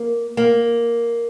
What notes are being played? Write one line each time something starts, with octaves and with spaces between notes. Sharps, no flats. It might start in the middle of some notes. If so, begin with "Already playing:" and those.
Already playing: A#3
A#3